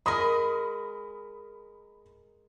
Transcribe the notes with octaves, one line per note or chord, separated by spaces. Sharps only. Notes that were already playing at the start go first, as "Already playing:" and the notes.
G#3 A#4 B5 D#6 A#6